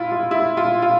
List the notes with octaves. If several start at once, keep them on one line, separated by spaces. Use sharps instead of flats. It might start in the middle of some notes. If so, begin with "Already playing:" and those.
Already playing: E4 F4
F4
E4
F4
F4